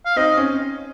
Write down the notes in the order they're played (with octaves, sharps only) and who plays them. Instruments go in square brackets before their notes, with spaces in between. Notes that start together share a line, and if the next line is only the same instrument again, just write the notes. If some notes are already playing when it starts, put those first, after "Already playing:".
[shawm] F5
[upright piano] C4 D#4 [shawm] D#5
[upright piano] C#4